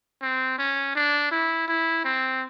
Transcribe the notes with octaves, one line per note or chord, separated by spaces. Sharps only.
C4
C#4
D4
E4
E4
C4